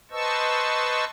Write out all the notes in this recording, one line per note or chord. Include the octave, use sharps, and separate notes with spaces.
B4 C5 D#5 A5 C#6 E6